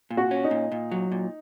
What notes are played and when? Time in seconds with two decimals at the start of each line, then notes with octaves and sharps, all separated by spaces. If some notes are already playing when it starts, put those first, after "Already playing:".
0.11 A#2
0.17 F#4
0.31 C#4
0.44 D#4
0.51 A#2
0.72 A#2
0.91 F#3
1.12 A#2